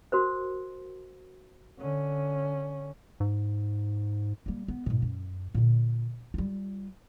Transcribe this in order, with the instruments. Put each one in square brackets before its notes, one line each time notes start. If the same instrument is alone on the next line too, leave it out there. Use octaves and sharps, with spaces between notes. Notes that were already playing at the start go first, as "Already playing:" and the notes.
[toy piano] F#4 A#4 C5
[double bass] D3 C#4
[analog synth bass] G#2
[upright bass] G3 A#3
B3
G#2 B2
F#2
A#2 D3
G3 F4